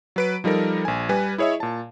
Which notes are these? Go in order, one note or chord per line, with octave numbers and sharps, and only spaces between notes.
F#3 B4 D7
F3 G3 D#4 A4 A#4
A#1 G#5
G3 B4 G#5
E4 G#4 C#5 D#5 E5
A#2 A5